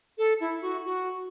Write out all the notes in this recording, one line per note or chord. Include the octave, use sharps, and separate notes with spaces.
A4
E4
F#4
F#4